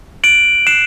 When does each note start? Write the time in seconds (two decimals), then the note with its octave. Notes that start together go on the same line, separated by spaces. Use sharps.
0.24 F#6 D7 F#7
0.66 F#6 C7 E7